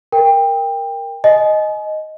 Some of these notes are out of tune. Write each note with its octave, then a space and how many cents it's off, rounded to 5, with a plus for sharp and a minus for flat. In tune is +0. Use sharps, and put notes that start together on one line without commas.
A#4 +0 G5 +20
D#5 +0 G#5 +30